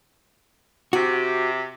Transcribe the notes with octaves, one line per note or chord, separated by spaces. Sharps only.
C3 F#4